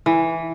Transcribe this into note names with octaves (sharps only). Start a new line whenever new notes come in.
E3